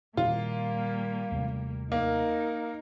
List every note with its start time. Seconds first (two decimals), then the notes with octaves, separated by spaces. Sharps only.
0.17 A#2 D#3 G3 A#3 F4
1.31 D#2 C3 A3
1.92 A#3 D#4 A#4